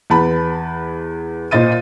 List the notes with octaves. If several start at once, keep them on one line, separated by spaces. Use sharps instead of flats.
E2 B4 A5 B5
A#2 C5 D#5 A6 D#7